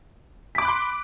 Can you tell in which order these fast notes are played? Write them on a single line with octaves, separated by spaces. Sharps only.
B6 D6 B5 F#6 C6